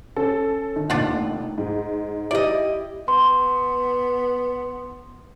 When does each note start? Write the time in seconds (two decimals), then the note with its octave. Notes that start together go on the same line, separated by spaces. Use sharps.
0.16 C#4 A4
0.76 D#3
0.90 F1 D#2 D4 F4 F#5
1.58 G#2
2.31 E4 G4 D5 D#5
3.08 B3 C6